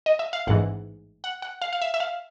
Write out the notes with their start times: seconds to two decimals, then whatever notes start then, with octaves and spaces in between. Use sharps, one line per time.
0.06 D#5
0.19 E5
0.33 F5
0.47 A1 G#2 E3 F#5
1.24 F#5
1.42 F#5
1.62 F5
1.73 F5
1.82 E5
1.94 E5
2.00 F5